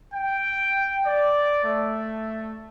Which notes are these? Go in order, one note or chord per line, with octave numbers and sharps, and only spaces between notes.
G5
D5
A3